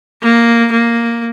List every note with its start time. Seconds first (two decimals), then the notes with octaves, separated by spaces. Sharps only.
0.22 A#3
0.72 A#3